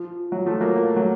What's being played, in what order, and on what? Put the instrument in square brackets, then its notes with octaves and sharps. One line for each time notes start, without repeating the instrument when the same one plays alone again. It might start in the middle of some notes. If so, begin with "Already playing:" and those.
Already playing: [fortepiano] F3
F#3
F3 A3
F#3 A#3
A#3
A3
F#3